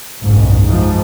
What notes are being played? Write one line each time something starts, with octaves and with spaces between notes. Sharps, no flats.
F#1 B1 G#2
G#2 F3